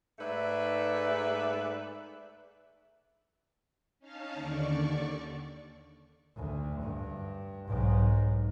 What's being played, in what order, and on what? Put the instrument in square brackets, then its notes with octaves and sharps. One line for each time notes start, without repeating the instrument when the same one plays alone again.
[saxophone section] G#2 A3 B4 D5 E5
[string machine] C#4 D#4 F5 A5 F6
D#2 D3 D5 C#6
[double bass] D2
G2
B1 G#2